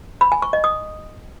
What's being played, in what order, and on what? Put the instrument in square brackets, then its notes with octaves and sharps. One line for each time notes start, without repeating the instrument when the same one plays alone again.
[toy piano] B5
G#5
C#6
D#5
D#6